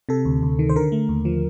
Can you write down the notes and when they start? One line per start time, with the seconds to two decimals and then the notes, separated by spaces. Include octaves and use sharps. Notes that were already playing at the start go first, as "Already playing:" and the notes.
0.09 C3 A4
0.25 D2
0.43 D2
0.59 D#3
0.69 C5
0.76 D3 A#4
0.92 A3
1.09 D#2
1.25 F3